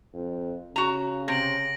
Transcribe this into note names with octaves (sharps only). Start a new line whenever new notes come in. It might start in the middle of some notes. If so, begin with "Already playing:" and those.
F2
C#3 F#4 A#5
C3 A#6 D7 F#7